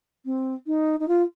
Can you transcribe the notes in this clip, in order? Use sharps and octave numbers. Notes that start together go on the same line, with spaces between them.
C4
D#4
D#4
F4